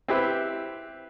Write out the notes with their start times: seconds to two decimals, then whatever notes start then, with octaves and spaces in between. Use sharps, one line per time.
0.08 C4 E4 G4 B4